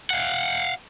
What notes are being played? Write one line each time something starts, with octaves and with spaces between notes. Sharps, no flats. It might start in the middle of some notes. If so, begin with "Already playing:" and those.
F5 F#5